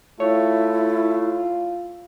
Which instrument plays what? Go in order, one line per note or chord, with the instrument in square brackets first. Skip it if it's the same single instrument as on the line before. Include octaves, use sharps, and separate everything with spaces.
[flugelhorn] A3 [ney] E4 [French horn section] F4 [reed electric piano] C#5